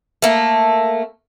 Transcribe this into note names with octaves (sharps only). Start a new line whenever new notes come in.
A3 A#3